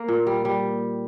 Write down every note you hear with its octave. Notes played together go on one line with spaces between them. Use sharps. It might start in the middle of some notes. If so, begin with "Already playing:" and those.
Already playing: A#3
A#2
G3
G3